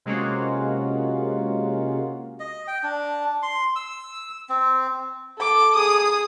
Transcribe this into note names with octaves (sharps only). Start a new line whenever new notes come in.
C3 G#3 A#3 C#4 F4 F#4
D#5
G5
D4
C6
E6
C4
A4 D6
G#4 D#6